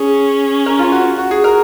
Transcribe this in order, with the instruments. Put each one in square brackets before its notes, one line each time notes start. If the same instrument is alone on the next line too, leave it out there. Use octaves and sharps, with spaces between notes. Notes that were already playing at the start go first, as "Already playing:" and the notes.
Already playing: [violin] C#4 [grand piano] G#4
[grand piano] A#4
F4
F#4
F#4
G#4
A#4